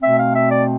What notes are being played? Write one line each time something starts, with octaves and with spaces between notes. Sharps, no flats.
B2 A3 C4 E5
F5
E5
D5